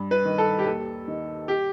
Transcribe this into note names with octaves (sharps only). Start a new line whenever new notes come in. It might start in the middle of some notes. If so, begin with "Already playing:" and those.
Already playing: G2
B4
D#3
A4
G4
D#2 A4
D#3
G4